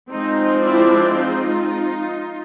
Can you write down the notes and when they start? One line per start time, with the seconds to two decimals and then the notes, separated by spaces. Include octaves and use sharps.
0.10 F3 G#3 C4 D#4
0.63 D4 E4
1.15 D#4 F4